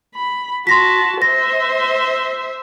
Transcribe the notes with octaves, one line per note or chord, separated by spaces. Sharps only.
B5
F#4 A5 C6 A#6 B6
C5 E5 A#6